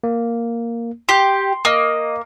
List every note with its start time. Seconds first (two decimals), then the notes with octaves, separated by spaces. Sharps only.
0.04 A#3
1.09 G4 C6
1.65 A#3 D#5 D#6